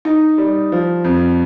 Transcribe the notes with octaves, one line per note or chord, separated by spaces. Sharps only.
D#4
G3
F3
F2